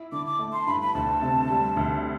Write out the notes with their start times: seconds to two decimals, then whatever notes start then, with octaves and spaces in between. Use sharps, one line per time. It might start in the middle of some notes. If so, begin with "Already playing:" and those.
Already playing: E4
0.12 D3 D6
0.26 D6
0.39 A3
0.53 C6
0.67 G2 B5
0.81 B5
0.95 D2 A5
1.22 C3
1.50 G3
1.77 D2